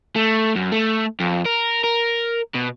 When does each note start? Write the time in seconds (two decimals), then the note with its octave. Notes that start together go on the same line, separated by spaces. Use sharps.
0.15 A3
0.56 F#2
0.72 A3
1.20 F2
1.46 A#4
1.84 A#4
2.55 B2